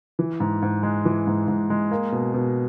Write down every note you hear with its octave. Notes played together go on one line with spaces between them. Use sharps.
E3
G#2
G#2
G#3
E3
G#2
G#2
G#3
A#3
B2
B2